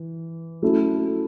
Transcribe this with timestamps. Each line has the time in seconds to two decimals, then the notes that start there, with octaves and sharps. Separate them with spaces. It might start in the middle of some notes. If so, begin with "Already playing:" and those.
Already playing: E3
0.62 F#3 A3 C#4 E4 A4